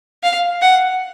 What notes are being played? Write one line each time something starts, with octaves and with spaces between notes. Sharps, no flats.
F5
F#5